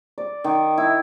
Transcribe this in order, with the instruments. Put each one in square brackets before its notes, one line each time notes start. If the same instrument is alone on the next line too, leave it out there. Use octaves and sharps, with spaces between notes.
[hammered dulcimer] D5
D#3
E4